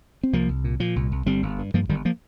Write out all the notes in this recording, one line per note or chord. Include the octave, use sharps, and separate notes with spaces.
C4
C2 F3 A#3
C2
A#2
A#2 F3
C2
C2
G1 G3 C4
G1
G2
G2 F3 A#3
G1 D#3 G3
F3 A#3